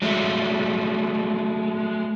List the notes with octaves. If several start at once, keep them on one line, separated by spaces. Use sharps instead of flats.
F#3 G#3 A3